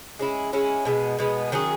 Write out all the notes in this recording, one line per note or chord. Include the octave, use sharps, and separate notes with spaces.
G#3 C#4 E4
G#3 C#4 E4
B2 G#3 B3
B2 G#3 B3
D#3 F#3 C#4 G#4